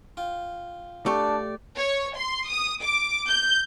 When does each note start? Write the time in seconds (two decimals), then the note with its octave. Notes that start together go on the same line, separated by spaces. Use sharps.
0.17 F4 G5
1.06 A3 D4 G4 D5 C#6
1.75 C#5
2.15 C6
2.48 D#6
2.81 D6
3.28 G6